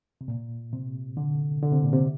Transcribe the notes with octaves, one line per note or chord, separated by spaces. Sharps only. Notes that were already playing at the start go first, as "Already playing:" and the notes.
C3
A#2
C3
D3
D3
C3
A#2
C3